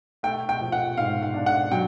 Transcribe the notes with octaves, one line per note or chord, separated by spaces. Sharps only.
A3 G5
G5
F3
F#5
G#2 F5
F5
D4
F#5
F#3 G5